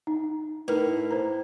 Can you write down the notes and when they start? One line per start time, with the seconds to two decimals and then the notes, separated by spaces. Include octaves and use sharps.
0.07 D#4
0.68 A2 D#4 A#4 B4
1.11 C5 A#5